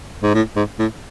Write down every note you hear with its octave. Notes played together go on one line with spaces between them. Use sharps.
G#2
A2
G#2
A2